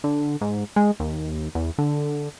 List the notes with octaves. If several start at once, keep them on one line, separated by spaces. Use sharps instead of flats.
D3
G#2
G#3
D#2
E2
D3